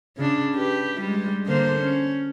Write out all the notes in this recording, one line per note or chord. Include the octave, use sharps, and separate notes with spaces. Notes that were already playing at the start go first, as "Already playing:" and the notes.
C#3 D4
G4 B4
G3 G#3
D3 A#3 C5
C#4